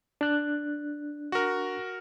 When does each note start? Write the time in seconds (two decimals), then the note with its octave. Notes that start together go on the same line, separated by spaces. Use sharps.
0.21 D4 F#6
1.32 F#4 A#4